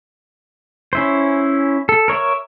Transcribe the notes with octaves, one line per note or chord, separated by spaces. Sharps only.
C#4 E4 C5
A4
A#4 C#5 D5 E5